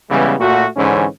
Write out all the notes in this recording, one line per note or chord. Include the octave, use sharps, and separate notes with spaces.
C#3 E3 G3 G#3 B3
A#2 A3 F#4
G#2 D3 E3 C#4